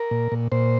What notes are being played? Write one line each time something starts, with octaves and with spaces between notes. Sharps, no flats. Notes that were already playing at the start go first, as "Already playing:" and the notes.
Already playing: A#4
A#2
A#2
A#2 C5